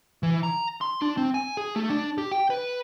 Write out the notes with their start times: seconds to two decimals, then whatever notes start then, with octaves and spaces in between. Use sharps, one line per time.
0.23 E3
0.43 A#5
0.81 C6
1.02 D4
1.17 C4
1.34 G#5
1.57 G#4
1.76 A3
1.90 D4
2.18 G4
2.31 G5
2.50 B4